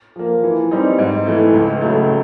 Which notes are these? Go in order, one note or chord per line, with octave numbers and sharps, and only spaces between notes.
F3 A#3
E3
G3 C4 D#4
G#2
E3 A3
C#2
C#3 F#3 A3